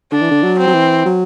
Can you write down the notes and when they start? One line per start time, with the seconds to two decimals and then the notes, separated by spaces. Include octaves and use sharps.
0.12 D3 D4
0.21 E3
0.31 D3
0.43 F#3
0.59 C4
0.67 F#3
0.74 E3
1.05 F#3